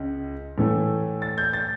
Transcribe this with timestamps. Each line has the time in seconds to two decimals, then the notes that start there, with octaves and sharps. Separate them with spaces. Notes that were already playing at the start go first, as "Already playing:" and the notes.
Already playing: C#2 C#3
0.58 A2 E3 A3
1.22 A6
1.38 G6
1.53 A6